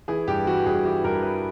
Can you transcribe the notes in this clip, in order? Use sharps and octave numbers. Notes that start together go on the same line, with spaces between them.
E3 G#4
G2 G4
E3 F#4
G2 G#4
E3 G4
G2 A#4
E3 B4